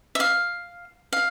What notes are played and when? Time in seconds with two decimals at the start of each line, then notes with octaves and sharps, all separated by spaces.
0.15 E5
0.20 F5
1.13 F5